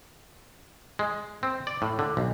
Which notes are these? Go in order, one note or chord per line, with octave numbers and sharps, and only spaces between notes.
G#3
C4
D5
A2
D3
B1